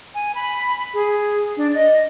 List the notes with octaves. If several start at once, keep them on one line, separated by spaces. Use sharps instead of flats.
G#5
B5
G#4
D4
D#5